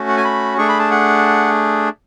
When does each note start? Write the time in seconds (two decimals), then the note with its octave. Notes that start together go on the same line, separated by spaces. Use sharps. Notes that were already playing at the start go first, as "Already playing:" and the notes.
Already playing: A3 C#4 F#4
0.08 F#5
0.17 G#5
0.25 B5
0.58 A3 D4 G#4 C#6
0.68 B5
0.79 A5
0.91 F#5